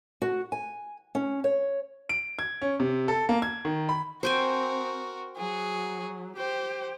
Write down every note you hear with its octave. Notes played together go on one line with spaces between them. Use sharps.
F#4
G#5
C#4
C#5
D7
G#6
C#4
C3
A4
A#3
G#6
D#3
B5
C4 F#4 A#4 C5 G5 G#5
F#3 F#4 G#4
G4 C5 G5